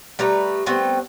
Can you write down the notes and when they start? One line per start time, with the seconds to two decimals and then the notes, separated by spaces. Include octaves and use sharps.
0.19 G3 A3 B4 A#5
0.66 G3 A3 B3 C4